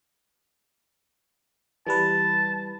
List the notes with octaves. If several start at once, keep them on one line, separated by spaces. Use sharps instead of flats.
E3 G3 B4 A5